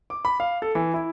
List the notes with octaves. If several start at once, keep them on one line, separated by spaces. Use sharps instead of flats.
D6
B5
F5
A4
E3
E4